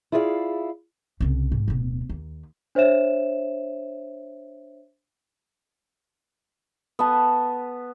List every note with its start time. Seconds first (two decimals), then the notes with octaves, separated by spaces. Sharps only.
0.12 E4 F4 G#4 D5 D#5 F5
1.20 C2 C#3
1.52 G#2
1.68 D1 B2
2.09 D#2
2.75 D4 C5 C#5 E5 E7
6.99 B3 A5